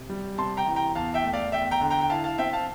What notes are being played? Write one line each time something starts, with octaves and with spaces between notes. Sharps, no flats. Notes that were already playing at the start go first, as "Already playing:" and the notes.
Already playing: C3
G3
C3 A5 C6
G5 A#5
E3
G5 A#5
E2 F5 A5
E5 G5
A3
D5 F5
E2 E5 G5
G5 A#5
D3
G5 A#5
G5
E4 F5 A5
F5 A5
C4 E5 G5
F5 A5